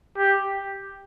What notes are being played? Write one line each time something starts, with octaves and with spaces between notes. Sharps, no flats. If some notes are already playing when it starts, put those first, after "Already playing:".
G4